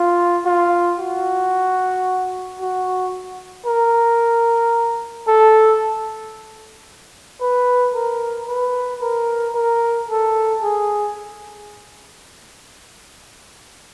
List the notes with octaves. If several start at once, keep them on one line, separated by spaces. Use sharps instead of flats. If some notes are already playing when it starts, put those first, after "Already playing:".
Already playing: F4
F4
F#4
F#4
A#4
A4
B4
A#4
B4
A#4
A#4
A4
G#4